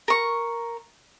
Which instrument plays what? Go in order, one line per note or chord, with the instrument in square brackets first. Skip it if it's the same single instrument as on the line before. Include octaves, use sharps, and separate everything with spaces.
[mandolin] A#4 C#6